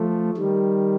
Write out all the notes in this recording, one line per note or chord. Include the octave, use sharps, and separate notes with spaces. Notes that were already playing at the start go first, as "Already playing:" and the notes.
Already playing: F3 A3
D#3 G3